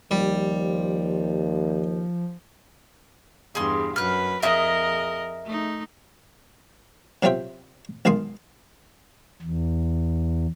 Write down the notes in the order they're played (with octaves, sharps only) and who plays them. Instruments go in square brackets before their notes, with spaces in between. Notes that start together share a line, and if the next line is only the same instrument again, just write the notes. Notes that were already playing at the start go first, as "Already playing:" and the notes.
[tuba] D#2 [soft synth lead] F3 [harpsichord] G3
[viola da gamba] E2 G2 [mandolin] G#4 C6
[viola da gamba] F#2 B4 [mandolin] F6 F#6
[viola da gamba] F2 A#4 D#5 [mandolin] G#4 E5 F#6
[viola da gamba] A3 D#4
[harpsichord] C3 F#3 C4 F4 E5 G5
B1 D#3 G#3 F5 C6 D#6
[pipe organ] E2